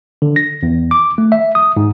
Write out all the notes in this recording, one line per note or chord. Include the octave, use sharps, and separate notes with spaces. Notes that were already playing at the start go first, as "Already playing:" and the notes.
D3
A#6
E2
D6
A3
E5
D#6
G#2